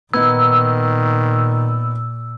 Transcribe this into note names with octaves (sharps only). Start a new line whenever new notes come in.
A#2 D#3 B3 D#4 E6